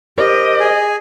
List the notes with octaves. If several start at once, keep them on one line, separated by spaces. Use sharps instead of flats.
G4 A#4 C5 D#5
G#4 G#5